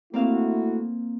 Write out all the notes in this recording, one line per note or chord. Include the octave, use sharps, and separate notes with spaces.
A3 A#3 C4 E4 F#4 F5